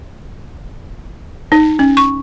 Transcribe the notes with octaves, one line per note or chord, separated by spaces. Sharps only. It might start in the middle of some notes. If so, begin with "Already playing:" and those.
D#4
C#4
C#6